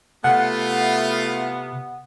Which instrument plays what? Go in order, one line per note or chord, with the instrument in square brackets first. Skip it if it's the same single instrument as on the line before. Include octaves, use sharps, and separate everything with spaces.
[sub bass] C3 [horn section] A3 E4 F4 [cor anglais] B3 [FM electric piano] F#5